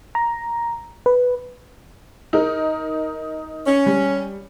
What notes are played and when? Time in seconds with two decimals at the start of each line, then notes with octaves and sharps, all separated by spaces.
0.15 A#5
1.06 B4
2.33 D#4 A#4
3.66 C#4
3.86 G3